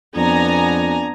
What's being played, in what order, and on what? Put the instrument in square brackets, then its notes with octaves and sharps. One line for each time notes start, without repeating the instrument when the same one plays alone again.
[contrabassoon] F2 [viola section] B3 G#5 A#5 [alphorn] D4